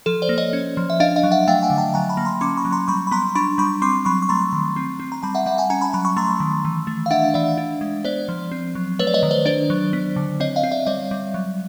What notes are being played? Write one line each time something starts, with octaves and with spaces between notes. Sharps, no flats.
F3 A4
C5 D5
A#3
C#5 D#5
C#4
F3
E5
D4 D#5 F5
D#5 F5
F#3
E5 F#5
A3 F5 G5
F#5 G#5
D3
G5 A5
F#3 G#5 A#5
A5 B5
A#3
A#5 C6
C#4 C6 D6
B5 C#6
F#3
A#5 C6
G3 B5 C#6
B5
B3 A#5 C6
D4 B5 C#6
G3 B5 C#6
C4 C6 D6
F#3 B5 C#6
C#6
A3 A#5 C6
D#3
C4
C4
A#5
G3 A5 B5
E5 F#5
G3 E5 F#5
F#5 G#5
C#4 G#5 A#5
A5 B5
F#3 A5 B5
B5 C#6
A3 A#5 C6
D#3
E3
A3
F5
D4 E5 F#5
E3 D5 E5
D4
G#3
B3 C5 D5
F3
C4
F#3
A3 B4 C#5
D5
C#5 D#5
D#3
C5 D5
D4 C5 D5
F#3
B3
D3
C4 C#5 D#5
D#5 F5
C4
D5 E5
G3 C#5 D#5
G3
F#3